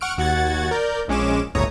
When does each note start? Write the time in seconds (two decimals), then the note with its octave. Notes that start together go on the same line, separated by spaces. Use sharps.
0.01 F#5 C#6 F6 D7
0.18 D#2 F#4 F#5 G#6 A6
0.71 A#4 D5 G6
1.08 A#1 G#3 C#4 D6 E7
1.55 G1 C#2 A2 C#5 A#5 D#6